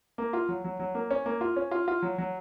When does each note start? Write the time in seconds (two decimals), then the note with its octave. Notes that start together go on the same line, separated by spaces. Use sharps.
0.18 A#3
0.33 F4
0.49 F#3
0.64 F#3
0.80 F#3
0.95 A#3
1.11 C#4
1.26 A#3
1.41 F4
1.56 C#4
1.71 F4
1.88 F4
2.02 F#3
2.18 F#3